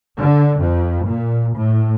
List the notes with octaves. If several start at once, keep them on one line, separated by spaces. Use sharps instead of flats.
D3
F2
A#2
A2